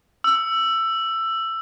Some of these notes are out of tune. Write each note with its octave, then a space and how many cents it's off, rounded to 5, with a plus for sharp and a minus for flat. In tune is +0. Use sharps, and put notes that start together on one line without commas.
E6 +15